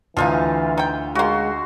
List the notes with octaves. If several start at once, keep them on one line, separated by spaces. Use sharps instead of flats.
D2 E3 F3 G#3 D#4 F4
D#4 G5
C#3 G#3 A#3 F#4 C6